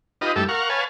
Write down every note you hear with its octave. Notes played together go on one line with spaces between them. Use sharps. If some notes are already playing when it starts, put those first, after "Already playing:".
D#4 F4 G4 B4 D#5
G2 A3 E4 G4 A4
A#4 F5 F#5 C#6
B4 C#5 F5 G#5 A5